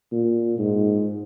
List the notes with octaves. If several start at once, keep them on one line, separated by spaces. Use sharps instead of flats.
A#2
G#2